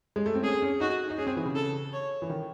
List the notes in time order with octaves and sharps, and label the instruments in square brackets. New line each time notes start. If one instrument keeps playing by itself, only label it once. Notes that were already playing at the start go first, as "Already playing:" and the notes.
[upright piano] G#3
A3
C4
[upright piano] C#4 [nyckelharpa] G#4
[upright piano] C#4
[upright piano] D#4 [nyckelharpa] F#4
[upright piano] D#4
[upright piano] C#4 [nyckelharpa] G#4
[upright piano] C4
E3
C#3
[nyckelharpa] A4
C#5
[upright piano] E3
D#3